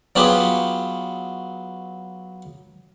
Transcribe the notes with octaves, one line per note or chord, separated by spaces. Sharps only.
F#3 B3 F4 G4 G#4 B4